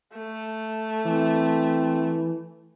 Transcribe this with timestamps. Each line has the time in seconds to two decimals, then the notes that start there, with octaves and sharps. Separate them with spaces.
0.14 A3
1.05 E3 C4